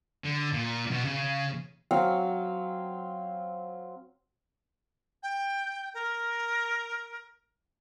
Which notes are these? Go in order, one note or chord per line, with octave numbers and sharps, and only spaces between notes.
D3
A#2
B2
C#3
F#3 C4 F5
G5
A#4